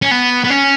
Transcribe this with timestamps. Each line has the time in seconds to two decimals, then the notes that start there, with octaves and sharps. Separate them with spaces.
0.02 C#4
0.11 B3
0.45 B3
0.50 C#4